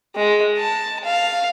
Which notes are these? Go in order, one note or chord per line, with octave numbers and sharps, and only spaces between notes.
G#3
A5
F5